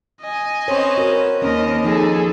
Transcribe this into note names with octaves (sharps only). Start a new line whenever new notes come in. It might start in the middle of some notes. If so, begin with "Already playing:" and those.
D#5 G#5
C4 C#4 B4 C#5
F#4 A#4 B4
D#2 C4 C#4 A#4 D#5
F3 D#4 G#4 A4